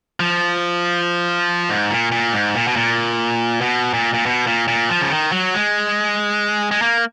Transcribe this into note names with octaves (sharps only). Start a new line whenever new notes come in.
F3
G#2
A#2
A#2
G#2
A#2
B2
A#2
B2
A#2
A#2
B2
A#2
A#2
F3
C#3
D#3
F#3
G#3
G#3
A#3